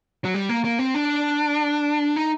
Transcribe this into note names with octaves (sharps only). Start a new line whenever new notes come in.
F#3
G3
A#3
A#3
C4
D4
D#4